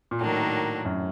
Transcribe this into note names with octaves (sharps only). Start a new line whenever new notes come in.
A#2
A2 D#3 F#3 A#3 D4
F#2